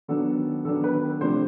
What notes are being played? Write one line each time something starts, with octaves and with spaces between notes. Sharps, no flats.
D#3 F#3 B3 D4 A4
D#3 F#3 B3 D4 A4
B4
C3 F3 A3 D4 C5